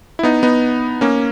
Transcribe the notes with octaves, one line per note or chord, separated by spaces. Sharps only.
E4
B3 D#4
B3 D#4
A#3 C#4